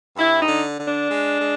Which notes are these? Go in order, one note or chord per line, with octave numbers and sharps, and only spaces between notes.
G2 E4
D#4
D3
D3
D4
G#3
G#3